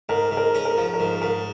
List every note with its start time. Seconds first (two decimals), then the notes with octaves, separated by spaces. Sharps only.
0.09 G#2 A#4
0.31 G#2
0.37 A#4
0.55 C#4
0.65 A#4
0.77 F3
0.94 A#4
1.00 G#2
1.22 G#2 A#4